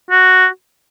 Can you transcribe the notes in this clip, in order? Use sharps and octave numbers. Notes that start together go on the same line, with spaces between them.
F#4